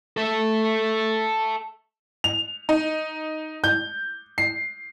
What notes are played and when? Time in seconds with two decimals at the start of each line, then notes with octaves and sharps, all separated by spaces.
0.17 A4 E5
2.24 F7
2.69 D#4
3.64 G6
4.38 C7